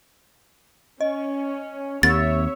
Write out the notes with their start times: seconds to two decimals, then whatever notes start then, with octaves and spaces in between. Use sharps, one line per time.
1.01 C#4 D#5
2.03 D#2 C4 G4 C#5 E5 A6